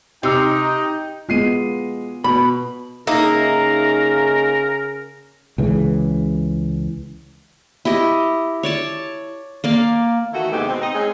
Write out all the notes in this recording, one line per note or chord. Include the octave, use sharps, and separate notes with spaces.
C3 D#4 G4 G5 E6 F7
G#3 B3 F4 C7 D#7
B2 B5
C#3 A#3 D#4 A#4 D#5 E5
C#2 C#3 E3
E4 G4 D#5
C#5 D5 A5
A#3 D5 F5
D#3 E3 A3 E4 F#4
D#2 G#2 C3 B3 G4
B2 G#3 C4
D#4 D#5
G#3 C4 C#4 D#4 G#4